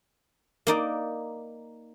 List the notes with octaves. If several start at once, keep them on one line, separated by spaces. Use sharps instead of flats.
A#3 D#4 D5